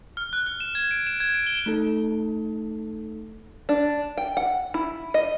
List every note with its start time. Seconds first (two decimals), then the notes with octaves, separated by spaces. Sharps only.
0.17 F6
0.33 F#6
0.46 F6
0.60 E7
0.75 G#6
0.91 D7
1.07 E7
1.20 G#6
1.35 D7
1.47 G7
1.66 A3 D#4 A4
3.69 D4
4.18 G5
4.37 F#5
4.74 E4
5.14 D#5